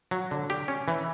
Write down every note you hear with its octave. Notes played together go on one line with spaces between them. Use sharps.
F#3
D3
G4
C#4
E3